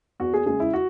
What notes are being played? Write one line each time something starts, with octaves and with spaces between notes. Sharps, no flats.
E2 F#4
G#4
C#3 G#3 G#4
E4
F#4